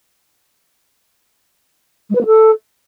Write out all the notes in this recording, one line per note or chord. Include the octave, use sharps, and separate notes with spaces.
G#3
B4
A#3
A4